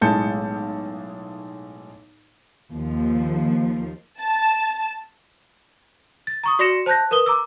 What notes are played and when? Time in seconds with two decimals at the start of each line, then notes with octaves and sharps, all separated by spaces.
0.01 B1 A2 G#3 A5 G6 C#7
2.72 D#2 F3
4.20 A5
6.27 A6
6.44 A#5 C#6 D#6
6.59 F#4 D5 C6 A#6 C#7 E7
6.86 C5 A5 F#6 G6 A#6
7.11 A#4 B4 D#6 G7
7.26 A#5 D6 E6